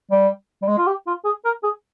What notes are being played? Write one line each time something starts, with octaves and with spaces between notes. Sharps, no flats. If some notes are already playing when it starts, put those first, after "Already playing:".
G3
G3
G#3
F4
G4
F4
G#4
A#4
G#4